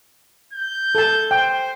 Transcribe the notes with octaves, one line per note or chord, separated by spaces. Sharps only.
G6
A4 A5
C5 G5